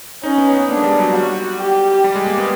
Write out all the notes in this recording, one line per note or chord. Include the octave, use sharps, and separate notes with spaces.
C#4 D#4
B3
B3
A#3 D4
G#3
G3
F#3
G3 F#4
G4
G3 G4
G#3
A#3
B3